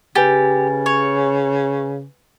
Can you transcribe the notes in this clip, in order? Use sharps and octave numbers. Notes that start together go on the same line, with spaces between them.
C#3 G4 B4 G#5 A6
C#5